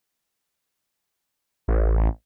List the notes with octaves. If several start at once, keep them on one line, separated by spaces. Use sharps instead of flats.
A1